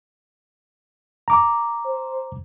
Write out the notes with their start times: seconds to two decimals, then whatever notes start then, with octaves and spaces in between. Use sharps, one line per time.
1.28 A#5 D6
1.85 C5